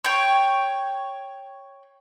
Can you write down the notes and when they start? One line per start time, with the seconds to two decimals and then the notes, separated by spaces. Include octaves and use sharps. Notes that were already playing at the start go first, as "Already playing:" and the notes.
0.04 C#5 G5